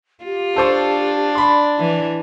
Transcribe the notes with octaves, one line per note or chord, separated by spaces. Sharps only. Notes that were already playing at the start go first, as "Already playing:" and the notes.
F4 G4
D4 A4 C5 C#6
D5 B5 C6
E3